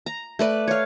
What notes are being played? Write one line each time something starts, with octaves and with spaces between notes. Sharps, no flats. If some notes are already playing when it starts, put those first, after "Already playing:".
A#5
A3 B4 D5
C#5 F5